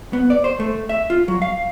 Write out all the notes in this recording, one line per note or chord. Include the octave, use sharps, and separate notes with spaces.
B3
D5
C5
A3
E5
F4
F#3
F5